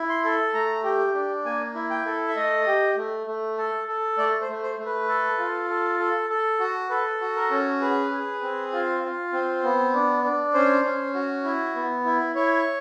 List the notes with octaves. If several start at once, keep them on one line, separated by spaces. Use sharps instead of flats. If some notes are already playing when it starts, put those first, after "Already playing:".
Already playing: E4
C6
A4
A3 A#5
G4
D4
A#3 G#5
E4
G5
A4
E5
A3 D#5
G4
A3
A3
A4
A4
A3 D5
C5
A3
C5
A3
B4
A4
F4
A4
A4
A4
F#4
A4 B4
F#4
A#4
C#4
G#4 B4
G#4
C4
F4
F4
C4
B3
D4
D4
C#4 C5
C#4
F#4
E4
B3
E4
E4 C#5